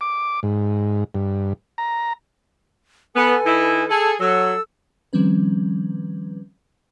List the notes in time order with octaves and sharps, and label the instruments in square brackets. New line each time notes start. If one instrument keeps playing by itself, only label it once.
[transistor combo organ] D6
G#2
G2
A#5
[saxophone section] B3 [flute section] A4 B4 G#5
[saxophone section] D#3 D#4 E4
[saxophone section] G#4 A4 [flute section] A5
[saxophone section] F#3 [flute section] A4 E6
[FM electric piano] D#3 F3 G3 C4 C#4 B4